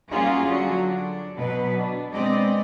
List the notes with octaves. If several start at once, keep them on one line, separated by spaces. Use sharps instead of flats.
G3 A#3 C#4 F4 F#4 G#4
D3 F#3 F#4
D4
B2 F#3 B4
D4
G#3 B3 C4 D5 D#5